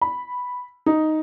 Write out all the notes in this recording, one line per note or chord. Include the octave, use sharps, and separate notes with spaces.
B5
D#4